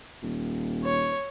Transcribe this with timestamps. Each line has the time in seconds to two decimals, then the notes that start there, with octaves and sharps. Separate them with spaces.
0.22 D#1
0.84 C#5